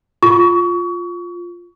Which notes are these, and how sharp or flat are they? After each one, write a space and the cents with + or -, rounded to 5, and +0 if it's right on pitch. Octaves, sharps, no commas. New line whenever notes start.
F4 +5 C#6 +30